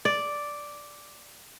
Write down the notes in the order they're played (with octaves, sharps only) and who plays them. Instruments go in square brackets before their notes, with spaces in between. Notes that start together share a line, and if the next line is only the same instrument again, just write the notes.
[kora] D5